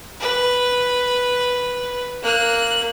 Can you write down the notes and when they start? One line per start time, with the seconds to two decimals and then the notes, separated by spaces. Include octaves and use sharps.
0.21 B4
2.22 A#3 F#6